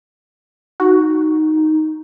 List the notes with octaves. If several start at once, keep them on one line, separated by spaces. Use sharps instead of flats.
D#4 F#4